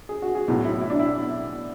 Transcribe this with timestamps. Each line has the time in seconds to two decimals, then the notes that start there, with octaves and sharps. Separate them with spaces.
0.09 G#4
0.22 F#4
0.35 G#4
0.48 B1 A2 F#3
0.65 E4
0.81 E4
0.90 D4
0.99 E4